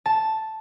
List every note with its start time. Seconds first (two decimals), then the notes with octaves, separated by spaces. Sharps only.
0.06 A5